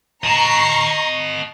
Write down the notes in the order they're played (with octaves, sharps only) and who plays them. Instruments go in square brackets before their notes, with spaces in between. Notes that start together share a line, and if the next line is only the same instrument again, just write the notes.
[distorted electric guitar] D#5 A5 [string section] A#5 C#6 C7